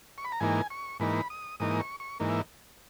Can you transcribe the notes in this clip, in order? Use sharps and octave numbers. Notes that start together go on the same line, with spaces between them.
C#6
B5
A#5
G#2 E3 A#3 D#4 G#5
C#6
G#2 E3 A#3 D#4 B5
D#6
G#2 E3 A#3 D#4 D#6
C#6
C#6
G#2 E3 A#3 D#4
E5